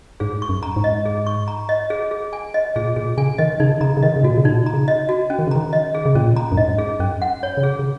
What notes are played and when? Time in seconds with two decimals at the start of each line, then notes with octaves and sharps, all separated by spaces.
0.20 G#2 G#4
0.42 C#6
0.49 F#2
0.63 A#5
0.76 G#2
0.84 D#5
1.05 G#4
1.27 C#6
1.48 A#5
1.69 D#5
1.90 G#4
2.11 G#4
2.33 G#5
2.54 D#5
2.76 A#2 G#4
2.96 A#2 G#4
3.17 C#3 G#5
3.38 D#3 D#5
3.60 C#3 D#4
3.81 C#3 A#5
3.97 C#3
4.03 D#3 D#5
4.16 C#3
4.23 A#2 F#4
4.37 C#3
4.45 A#2 D#4
4.66 A#5
4.74 C#3
4.88 D#5
5.09 F#4
5.30 C#4
5.39 D#3
5.47 C#3
5.51 D#3 A#5
5.73 D#5
5.95 G#4
6.06 C#3
6.15 A#2 C#4
6.36 A#5
6.52 F#2
6.57 G#2 D#5
6.78 G#4
7.00 F#2 C#4
7.22 F#5
7.43 C#5
7.57 C#3
7.63 G#4
7.79 C#3